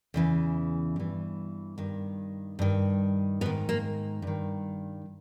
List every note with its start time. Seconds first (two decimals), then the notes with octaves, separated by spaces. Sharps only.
0.14 E2 C#3 E3
0.96 G2 E3
1.78 G2 D#3
2.59 G2 D#3
3.41 G#2 B3
3.46 D#3
3.69 A#3
4.22 G2 D#3